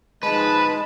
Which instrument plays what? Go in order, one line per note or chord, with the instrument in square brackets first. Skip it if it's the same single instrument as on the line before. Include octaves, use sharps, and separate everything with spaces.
[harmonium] G#2 F3 [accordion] G#3 [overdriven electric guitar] B4 [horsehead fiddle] A5 B5